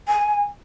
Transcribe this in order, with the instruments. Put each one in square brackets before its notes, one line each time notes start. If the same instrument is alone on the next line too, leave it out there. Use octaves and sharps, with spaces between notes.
[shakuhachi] G#5